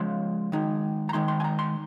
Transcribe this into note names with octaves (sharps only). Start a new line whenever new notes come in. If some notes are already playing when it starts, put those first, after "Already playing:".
Already playing: C#3 F3 G#3 C6
D#3 G#3 D#4
A#5
D#3 G#3 D#4 C6
C6
G#5
A#5
C6